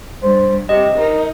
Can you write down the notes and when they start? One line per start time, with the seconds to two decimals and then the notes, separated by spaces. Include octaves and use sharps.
0.23 G2 C5
0.69 C3 G4 D#5
0.98 D#4 A#4